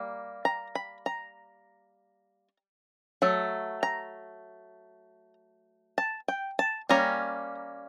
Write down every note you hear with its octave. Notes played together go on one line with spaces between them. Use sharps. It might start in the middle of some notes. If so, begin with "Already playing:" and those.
Already playing: G3 A#3
A#5
B5
A#5
F#3 A3
A#5
A5
G5
A5
G3 A#3 C#4 A#5